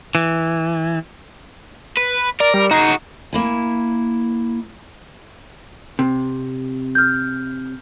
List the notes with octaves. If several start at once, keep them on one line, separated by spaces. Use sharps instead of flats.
E3
B4
A#4 D5
G3
D#4 F#4 G#4
A#3 E4 G#5
C3
F6 G6